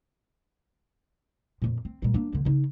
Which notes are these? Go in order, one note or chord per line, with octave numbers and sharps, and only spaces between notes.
F2 A#2
C4
A#2 G3
A#3 D4
D2 D3
C#3 D#4